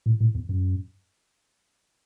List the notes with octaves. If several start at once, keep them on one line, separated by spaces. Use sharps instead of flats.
A2
A2
E2
F#2